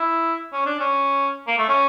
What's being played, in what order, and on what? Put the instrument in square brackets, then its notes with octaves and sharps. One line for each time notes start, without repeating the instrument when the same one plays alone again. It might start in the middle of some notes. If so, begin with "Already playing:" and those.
Already playing: [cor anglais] E4
C#4
D4
C#4
A#3
A3
C#4